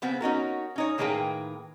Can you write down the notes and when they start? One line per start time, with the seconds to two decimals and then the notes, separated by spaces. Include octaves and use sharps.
0.02 C#3 B3 C4
0.21 C#4 D#4 F#4 A#4
0.76 C#4 D#4 C#5
0.98 A2 D#3 A#3 G#4 B4 G5